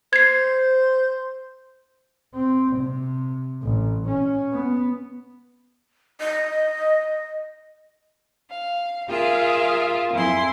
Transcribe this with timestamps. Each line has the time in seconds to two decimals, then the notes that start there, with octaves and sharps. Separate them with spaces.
0.13 C5 G#6 C7
2.35 C4
2.77 C3
3.63 A1
4.07 C#4
4.52 B3
6.20 D#5
8.50 F5
9.08 F4 G#4 A#4 E5 F5
10.13 F2 E4 G#5 C6